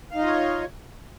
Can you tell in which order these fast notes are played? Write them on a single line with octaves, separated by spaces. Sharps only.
F5 D#4 D#5 F4 C#5